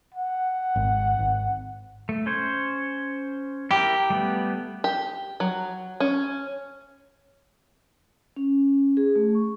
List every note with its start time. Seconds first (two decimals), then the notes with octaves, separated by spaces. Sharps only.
0.14 F#5
0.76 G#1
1.19 G#1
2.09 A3
2.26 C#4 C5 C#5
3.71 E4 G4 A#4
4.10 G3 A3 B3
4.84 G4
5.40 F#3
6.00 C#4
8.36 C#4
8.97 G#4
9.15 A3
9.35 C#6